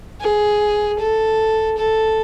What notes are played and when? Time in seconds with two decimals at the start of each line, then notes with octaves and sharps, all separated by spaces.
0.21 G#4
0.99 A4
1.77 A4